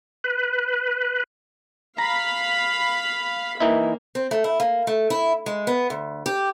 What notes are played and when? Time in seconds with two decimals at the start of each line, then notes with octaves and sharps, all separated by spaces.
0.24 B4
1.98 F5 A#5 B5
3.60 E3 A#3 D#4 E4
4.15 C4
4.31 A3
4.44 E4
4.60 A#3
4.87 A3
5.10 E4
5.46 G#3
5.67 B3
5.90 D2
6.26 G4